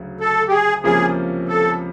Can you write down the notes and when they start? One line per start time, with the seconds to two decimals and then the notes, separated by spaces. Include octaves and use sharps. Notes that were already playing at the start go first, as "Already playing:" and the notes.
Already playing: D2 C#3 F#3
0.20 A4
0.48 G4
0.52 G#4
0.84 C#2 C3 F3 A#3 C#4 G#4
1.48 A4